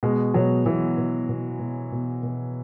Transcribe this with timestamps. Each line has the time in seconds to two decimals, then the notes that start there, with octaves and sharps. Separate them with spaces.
0.03 B2 G#3
0.34 B2 F#3
0.65 B2 E3
0.98 B2
1.29 B2
1.60 B2
1.92 B2
2.23 B2